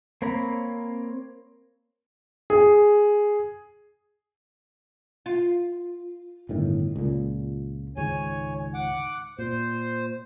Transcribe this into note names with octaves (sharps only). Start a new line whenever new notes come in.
A#3 C4 C#5 A#5 B5
G#4
F4
G1 A2 D#3
C#2 A#2
C#2 G#2 D#3 C#5 G#5
F#5 D6
A#2 C5